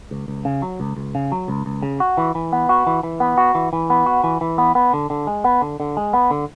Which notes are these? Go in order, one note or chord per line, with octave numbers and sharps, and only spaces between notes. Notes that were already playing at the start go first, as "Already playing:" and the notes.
C#2
C#2
C#3
F#3
C#2
C#2
C#3
F#3
C#2
C#2
C#3
F#4
E3
E3
B3
F#4
E3
E3
B3
F#4
E3
E3
B3
F#4
E3
E3
B3
B3
D3
D3
G#3
B3
D3
D3
G#3
B3
D3